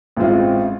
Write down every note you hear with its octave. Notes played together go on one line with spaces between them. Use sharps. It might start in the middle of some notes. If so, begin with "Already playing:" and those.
A1 A2 G#3 C4 F4